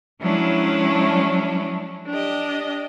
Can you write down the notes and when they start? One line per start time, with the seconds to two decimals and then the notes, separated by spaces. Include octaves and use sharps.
0.21 F3 F#3 G#3 C#4 D4 E4
2.07 D4 G4 D#5